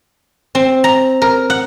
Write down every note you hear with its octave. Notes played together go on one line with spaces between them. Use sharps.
C4
A#5
A#4
F#5